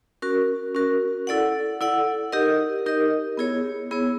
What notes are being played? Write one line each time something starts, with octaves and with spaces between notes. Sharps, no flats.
C#4 F#4 A#4
C#4 F#4 A#4
E4 A4 D5 F#5
E4 A4 D5 F#5
D#4 G4 A#4 D#5
D#4 G4 A#4 D#5
B3 E4 G#4 C#5
B3 E4 G#4 C#5